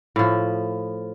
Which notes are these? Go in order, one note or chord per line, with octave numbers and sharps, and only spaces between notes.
A2 F3